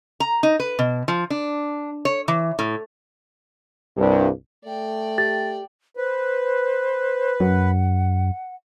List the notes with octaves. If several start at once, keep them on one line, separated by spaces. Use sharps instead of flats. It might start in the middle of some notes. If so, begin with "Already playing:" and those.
A#5
D#4
B4
B2
F3
D4
C#5
E3
A2
C2 G2
A3 D5 G5
G4 A6
B4 C5
F#2 F#5